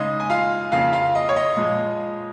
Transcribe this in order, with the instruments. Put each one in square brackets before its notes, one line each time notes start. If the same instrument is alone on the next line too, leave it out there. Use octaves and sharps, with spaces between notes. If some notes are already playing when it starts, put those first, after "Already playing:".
Already playing: [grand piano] C#3 G#3 D#4 D#5
G#5
F4 F5
F2 C#3 A#3 F4 F5
F4 F5
D#5
C#5
D#5
A#2 F3 G#3